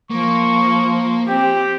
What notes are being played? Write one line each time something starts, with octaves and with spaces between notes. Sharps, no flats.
F3 A#3 C#6
C4 G4